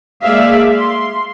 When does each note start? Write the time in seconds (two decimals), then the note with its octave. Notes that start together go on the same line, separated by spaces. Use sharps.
0.23 G#3 A#3 G#4 D5 E5 F5
0.77 C6